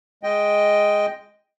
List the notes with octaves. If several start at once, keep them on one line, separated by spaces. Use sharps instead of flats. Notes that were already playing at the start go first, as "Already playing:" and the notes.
G#3 D#5 G5